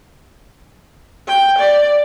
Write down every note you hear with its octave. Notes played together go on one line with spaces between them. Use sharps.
G5
D5